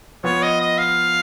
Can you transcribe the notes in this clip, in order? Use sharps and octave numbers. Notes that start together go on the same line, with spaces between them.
F3 B3 F4 C#5
D#5
D#5
F5